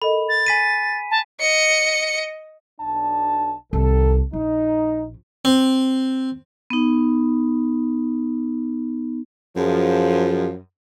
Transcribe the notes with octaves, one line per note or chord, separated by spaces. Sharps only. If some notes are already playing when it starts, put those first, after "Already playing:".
A4 A#4 D#5 B5
A6
G#5 B6 D#7
A5
D#5 C#7
B1 D4 A5
C2 D#3 A4
A#1 D#4
C4
B3 D#4
F#2 F3 G#4